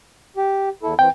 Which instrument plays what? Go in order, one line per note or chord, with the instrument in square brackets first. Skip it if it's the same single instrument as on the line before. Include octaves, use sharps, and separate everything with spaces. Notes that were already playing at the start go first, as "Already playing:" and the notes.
[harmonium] G4
E2 E4 A4
[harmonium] E3 C4 [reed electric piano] G5